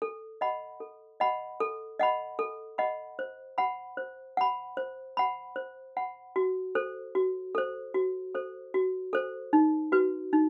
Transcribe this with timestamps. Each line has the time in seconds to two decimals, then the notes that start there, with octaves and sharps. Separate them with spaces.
0.02 A4
0.41 D#5 F#5 B5
0.80 A4
1.20 D#5 F#5 B5
1.60 A4
1.99 D#5 F#5 B5
2.39 A4
2.78 D#5 F#5 B5
3.19 C5
3.58 F#5 B5
3.97 C5
4.37 F#5 B5
4.77 C5
5.17 F#5 B5
5.56 C5
5.97 F#5 B5
6.36 F#4
6.75 A4 C5
7.15 F#4
7.55 A4 C5
7.94 F#4
8.35 A4 C5
8.74 F#4
9.13 A4 C5
9.53 D#4
9.92 F#4 B4
10.33 D#4